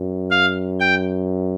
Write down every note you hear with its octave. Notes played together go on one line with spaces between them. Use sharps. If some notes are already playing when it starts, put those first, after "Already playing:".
Already playing: F#2
F5
G5